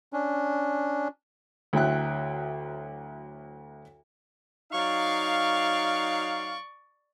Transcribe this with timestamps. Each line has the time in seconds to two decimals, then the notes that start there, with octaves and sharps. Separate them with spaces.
0.13 C#4 D4
1.73 D2 F#3 E4 G5 F#6
4.73 F#3 D#4 D5 F5 C#6